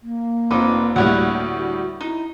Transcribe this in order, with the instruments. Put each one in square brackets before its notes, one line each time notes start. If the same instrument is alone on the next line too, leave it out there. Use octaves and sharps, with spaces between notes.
[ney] A#3
[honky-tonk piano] F1 C4 F4 [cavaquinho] D#4 B4 D6
[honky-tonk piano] D2 A2 G3 [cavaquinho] E4 C#5 F#5
[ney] F#4
[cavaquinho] D#4 [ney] E4